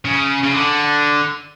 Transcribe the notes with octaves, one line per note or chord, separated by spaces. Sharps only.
C#3
C#3
D3